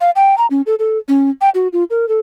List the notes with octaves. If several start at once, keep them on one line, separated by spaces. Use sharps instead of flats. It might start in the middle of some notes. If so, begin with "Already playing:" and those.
F5
G5
A#5
C#4
A4
A4
C#4
G5
F#4
F4
A#4
A4